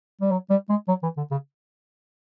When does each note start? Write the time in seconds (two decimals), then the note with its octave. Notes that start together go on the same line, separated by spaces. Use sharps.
0.21 G3
0.31 F#3
0.50 G3
0.69 G#3
0.88 F#3
1.03 E3
1.17 D3
1.31 C#3